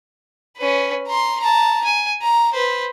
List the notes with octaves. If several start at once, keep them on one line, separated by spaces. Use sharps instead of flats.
C#4 B4
A#5 C6
A5 A#5
G#5
A#5
B4 C5